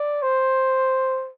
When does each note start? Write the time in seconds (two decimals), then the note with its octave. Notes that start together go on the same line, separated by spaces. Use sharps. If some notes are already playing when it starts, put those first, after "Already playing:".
Already playing: D5
0.22 C5